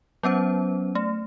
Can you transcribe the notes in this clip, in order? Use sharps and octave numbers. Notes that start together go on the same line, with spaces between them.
F#3 B3 C#4 C5
A3